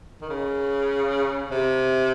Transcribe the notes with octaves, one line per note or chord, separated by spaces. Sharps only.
D#3
C#3
C3